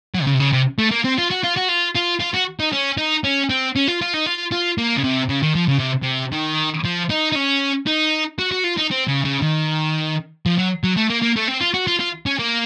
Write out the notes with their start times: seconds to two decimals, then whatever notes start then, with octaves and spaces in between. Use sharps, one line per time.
0.14 F#3
0.22 C3
0.27 C#3
0.34 C3
0.40 C#3
0.53 C3
0.79 A3
0.91 A#3
1.04 C4
1.18 F4
1.30 F#4
1.43 F4
1.56 F#4
1.68 F4
1.95 F4
2.20 F4
2.34 F#4
2.60 D#4
2.73 C#4
2.98 D#4
3.24 C#4
3.50 C4
3.76 C#4
3.88 F4
4.01 F4
4.14 D#4
4.26 F4
4.52 F4
4.78 A#3
4.97 C#3
5.04 C3
5.29 C#3
5.43 D#3
5.55 F3
5.68 C#3
5.79 C3
6.03 C3
6.32 D#3
6.85 F3
7.10 D#4
7.32 D#4
7.36 C#4
7.87 D#4
8.39 F#4
8.52 F#4
8.64 F4
8.77 D#4
8.91 C4
9.08 C#3
9.25 C#3
9.42 D#3
10.46 F3
10.58 F#3
10.84 F#3
10.97 A3
11.10 A#3
11.22 A#3
11.36 A3
11.48 C4
11.61 F4
11.74 F#4
11.87 F4
12.00 F4
12.26 C#4
12.39 A#3